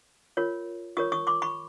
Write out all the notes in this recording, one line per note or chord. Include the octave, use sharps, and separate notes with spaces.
F4 A#4 C#5
F4 A#4 C#5 C#6 D#6
C#6 D#6
C6 D6
B5 C#6